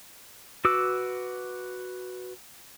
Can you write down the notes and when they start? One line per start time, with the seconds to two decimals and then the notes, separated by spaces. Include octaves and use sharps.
0.65 F#4 B4 D6 E6